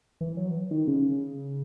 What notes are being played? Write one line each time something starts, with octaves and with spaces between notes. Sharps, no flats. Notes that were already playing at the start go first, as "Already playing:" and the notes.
E3
F#3
D#3
C#3